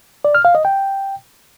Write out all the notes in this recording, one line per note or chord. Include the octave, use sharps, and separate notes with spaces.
D5
F6
F5
D#5
G5